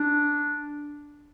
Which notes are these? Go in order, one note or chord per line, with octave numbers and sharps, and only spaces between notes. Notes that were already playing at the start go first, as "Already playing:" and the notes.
Already playing: D4